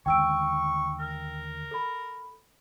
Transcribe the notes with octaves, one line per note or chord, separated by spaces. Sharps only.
D#2 D3 G#3 G5 C#6 E6 D7
A#4
A4 B5